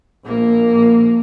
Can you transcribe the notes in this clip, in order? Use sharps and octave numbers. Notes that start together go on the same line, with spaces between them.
A#1 A#3